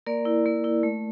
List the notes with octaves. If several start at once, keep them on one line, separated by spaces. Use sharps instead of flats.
A#3 A#4 D5
E4
A#3
E4
A3